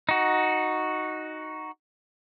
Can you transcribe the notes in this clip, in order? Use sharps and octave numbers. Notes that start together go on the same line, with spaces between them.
D#4 F#4